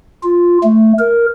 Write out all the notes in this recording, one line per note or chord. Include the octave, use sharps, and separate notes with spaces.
F4
A3
A#4